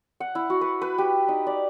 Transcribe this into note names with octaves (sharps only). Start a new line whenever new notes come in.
F#5
E4
F#4
B4
B4
G4
D#4
D5